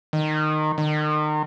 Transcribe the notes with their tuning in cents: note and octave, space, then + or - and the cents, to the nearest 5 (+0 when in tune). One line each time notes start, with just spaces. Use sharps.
D#3 -15
D#3 -35